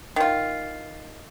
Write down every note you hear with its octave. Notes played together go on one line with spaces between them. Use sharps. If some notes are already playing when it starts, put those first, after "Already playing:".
D#3 F4